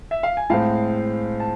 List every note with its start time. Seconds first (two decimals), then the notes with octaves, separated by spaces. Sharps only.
0.11 E5
0.23 F5
0.37 G#5
0.50 A2 G#3 C4 F5 A5
1.40 A5